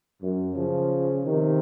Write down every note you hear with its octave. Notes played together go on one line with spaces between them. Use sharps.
F#2
C#3 F3
C3 D#3